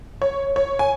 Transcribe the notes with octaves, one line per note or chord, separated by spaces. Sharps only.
C#5
C#5
G#5